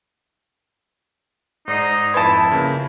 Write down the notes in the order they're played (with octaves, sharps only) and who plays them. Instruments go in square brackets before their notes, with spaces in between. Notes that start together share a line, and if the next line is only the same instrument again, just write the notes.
[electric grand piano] G#2 D5 C7 [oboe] D#4
[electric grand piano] F2 G#6 [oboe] E4 [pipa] B4 A5
[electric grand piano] C#3 A#3